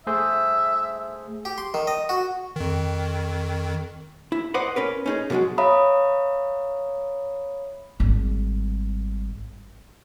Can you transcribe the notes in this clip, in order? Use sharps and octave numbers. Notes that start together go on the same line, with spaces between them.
A3 G#4 C5 E5
G4
C6
D#3
D#5
F#4
F2 D#3
E4
B4 C5 D5 D#5 F#5
C#4 A#4 B4
C#4 D#4 G#4
B2 D3 E3 F#3 G#3
C#5 E5 F5 A#5 B5 D#6
G#1 G3